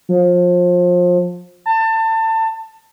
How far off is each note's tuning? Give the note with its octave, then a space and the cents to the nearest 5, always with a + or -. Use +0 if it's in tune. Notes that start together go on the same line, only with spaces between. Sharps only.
F3 +30
A5 +25